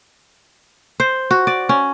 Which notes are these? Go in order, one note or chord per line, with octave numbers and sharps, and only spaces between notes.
C5
F#4
D5
C#4